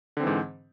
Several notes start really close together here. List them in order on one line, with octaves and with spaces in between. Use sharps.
D3 C4 E3 G#2